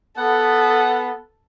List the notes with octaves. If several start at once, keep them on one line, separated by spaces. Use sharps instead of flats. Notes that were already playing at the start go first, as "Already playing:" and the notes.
B3 A4 F#5